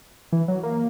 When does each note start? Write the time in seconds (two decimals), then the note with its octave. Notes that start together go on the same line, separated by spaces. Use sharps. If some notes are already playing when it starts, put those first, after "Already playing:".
0.32 E3
0.48 F#3
0.63 A#3